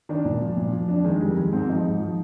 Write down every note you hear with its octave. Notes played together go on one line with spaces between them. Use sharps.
D#3 D4
A#2
F3
A#2
F3
F2 D4
D#3 G#3
F2 G3
D#3 G#3
G#2 C4
F3 D#4
G#2
F3